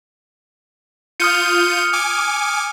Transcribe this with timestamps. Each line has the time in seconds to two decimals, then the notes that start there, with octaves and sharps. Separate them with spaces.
1.20 F4 D#6 F6 G6 C#7 D#7
1.93 G#5 D6